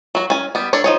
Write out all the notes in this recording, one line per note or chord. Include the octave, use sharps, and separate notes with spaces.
F#3 F#4
C#4 G#5
G3 B3
D4 A4 C#5
F3 D#4 C#5